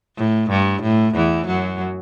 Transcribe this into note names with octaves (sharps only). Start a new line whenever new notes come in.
A2
G2
A2
E2 E3
F#2 F#3